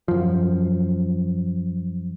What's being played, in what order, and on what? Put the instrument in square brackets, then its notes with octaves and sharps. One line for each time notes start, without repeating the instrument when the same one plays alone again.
[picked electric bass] F#2 F3